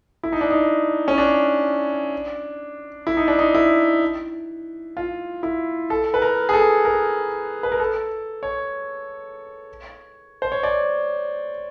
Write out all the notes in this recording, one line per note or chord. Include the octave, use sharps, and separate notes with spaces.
E4
D#4
D4
D#4
C#4
D4
E4
D#4
D4
D#4
E4
F4
E4
A4
B4
A#4
G#4
A4
A#4
B4
A#4
A4
C#5
C5
C#5
D5